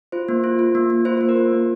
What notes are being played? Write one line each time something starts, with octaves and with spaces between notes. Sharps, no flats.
F4 C5
A#3
F4
F4
A#3
A#3
F4 C5
C5
A#3
A#4
F4
A#3